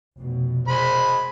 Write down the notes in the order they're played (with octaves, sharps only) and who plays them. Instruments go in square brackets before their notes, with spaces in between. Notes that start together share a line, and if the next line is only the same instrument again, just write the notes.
[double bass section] F1 B2
[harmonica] G#3 C5 B5